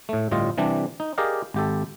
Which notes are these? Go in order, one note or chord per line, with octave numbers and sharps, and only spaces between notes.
A2 A3
G1 A2 G3 F4 D#5
C3 E3 G3 D4
D#4
G4 G#4 A#4 D5 D#5 F5
G#1 G4 A4